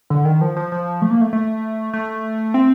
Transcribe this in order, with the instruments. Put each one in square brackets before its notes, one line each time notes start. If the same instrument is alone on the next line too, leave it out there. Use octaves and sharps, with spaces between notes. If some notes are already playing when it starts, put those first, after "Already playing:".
[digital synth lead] D3
D#3
F3
F3
F3
A3
A#3
A3
A3
A3
C4